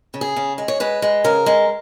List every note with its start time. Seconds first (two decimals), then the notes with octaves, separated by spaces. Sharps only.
0.14 C#3
0.21 G#4
0.36 C#3
0.58 G#3
0.68 C#5
0.80 G#3 B4
1.02 G#3
1.24 C#3 A#4
1.46 G#3